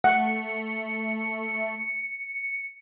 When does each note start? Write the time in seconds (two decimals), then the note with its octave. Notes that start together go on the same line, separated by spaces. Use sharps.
0.04 A3 F#5 C#7